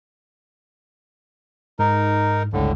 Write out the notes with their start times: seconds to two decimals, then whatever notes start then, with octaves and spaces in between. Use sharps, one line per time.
1.79 G#2 D#4 A#4
2.53 G1 C#2 A2 D3